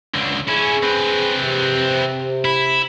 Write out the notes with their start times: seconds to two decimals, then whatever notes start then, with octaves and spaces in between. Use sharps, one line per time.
0.14 C#2 D3
0.48 C#4 E4 G#4
0.83 C4 B4
1.38 C3
2.45 E4